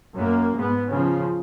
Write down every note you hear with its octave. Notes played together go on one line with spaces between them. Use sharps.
F#2 A#3
G#2 B3
C#3 F3